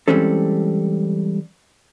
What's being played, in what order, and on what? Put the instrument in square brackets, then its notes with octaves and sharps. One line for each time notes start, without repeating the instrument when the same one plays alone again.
[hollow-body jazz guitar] E3 G3 G#3 C4 C#4 A4